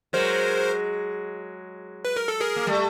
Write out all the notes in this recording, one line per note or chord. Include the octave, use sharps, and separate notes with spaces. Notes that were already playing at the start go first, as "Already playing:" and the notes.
F#3 G#3 A#4 C5
B4
A#4
A4
G#4 A#4
A#3
G3 A3